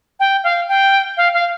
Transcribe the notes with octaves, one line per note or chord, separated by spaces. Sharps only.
G5
F5
G5
F5
F5